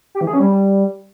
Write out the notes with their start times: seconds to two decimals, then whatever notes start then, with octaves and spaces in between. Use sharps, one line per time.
0.15 G4
0.21 E3
0.27 G#4
0.33 C#4
0.40 G3